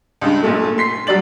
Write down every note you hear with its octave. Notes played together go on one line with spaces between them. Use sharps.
C#2 G2
B1 A#2 A3
C6 B6 C7
F#3 G3 D5 A6 F#7